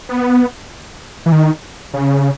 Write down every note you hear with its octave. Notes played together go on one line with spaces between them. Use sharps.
B3
E3
D#3
C#3